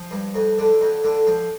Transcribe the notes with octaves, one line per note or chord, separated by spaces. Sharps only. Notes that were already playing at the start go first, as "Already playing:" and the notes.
Already playing: F3
G2
F2
D3
F2
D3
F3